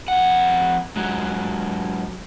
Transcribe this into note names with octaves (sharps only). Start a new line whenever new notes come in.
F2 F#5
G#2 F#3